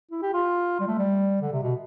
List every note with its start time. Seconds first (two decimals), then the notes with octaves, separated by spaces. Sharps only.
0.11 E4
0.22 G4
0.33 F4
0.80 G3
0.87 A3
0.98 G3
1.42 D3
1.52 C3
1.63 B2